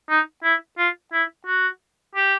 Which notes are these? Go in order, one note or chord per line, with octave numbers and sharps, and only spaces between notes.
D#4
E4
F4
E4
F#4
G4